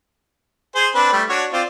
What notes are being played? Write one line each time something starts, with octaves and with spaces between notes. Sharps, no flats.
G#4 C5
C4 D4 B4
G3 A3
D4 F#4 C#5
C4 F4 D5